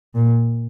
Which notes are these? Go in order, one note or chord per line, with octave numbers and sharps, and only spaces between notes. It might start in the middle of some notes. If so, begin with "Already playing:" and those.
A#2